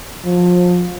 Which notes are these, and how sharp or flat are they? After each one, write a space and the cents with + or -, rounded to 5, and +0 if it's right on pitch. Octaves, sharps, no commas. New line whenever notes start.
F3 +30